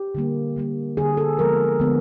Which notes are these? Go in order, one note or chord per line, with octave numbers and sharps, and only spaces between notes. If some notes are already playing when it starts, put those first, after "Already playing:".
Already playing: G4
D3 G3 A#3
D3 G3 A#3
D3 G3 A#3 G#4
A4
D3 F3 G#3 B3 A#4
D3 F3 G#3 B3